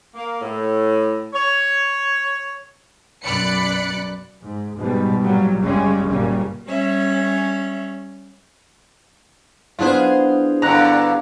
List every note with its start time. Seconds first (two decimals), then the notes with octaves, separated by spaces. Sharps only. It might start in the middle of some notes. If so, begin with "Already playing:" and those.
0.15 A#3
0.42 A2
1.33 C#5
3.24 B1 F#2 D5 B5 F#6 C#7
4.44 G#2
4.77 G#2 B2 G3
5.21 A#2 F#3 G3
5.63 F#1 C#3 G3 G#3 C#4
6.10 F#1 A#2 C#3 G3 A#3 C#4
6.65 G3 C#4 C#5 E5
9.79 B3 D4 E4 F4 G#4 C5
10.62 G2 D3 A#5 F#6